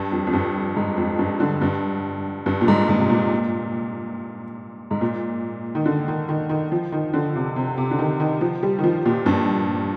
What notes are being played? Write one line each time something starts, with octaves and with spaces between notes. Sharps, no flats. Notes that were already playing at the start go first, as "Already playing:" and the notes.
Already playing: G2
F2
F2
G2
G#2
F2
G2
D3
G2
G2
A#2
G#2
G#2
C3
A#2
G#2
A#2
D#3
D3
D#3
D#3
D#3
F3
D#3
D3
C3
C3
C3
D3
D#3
D#3
F3
G3
D#3
F3
A#2
G2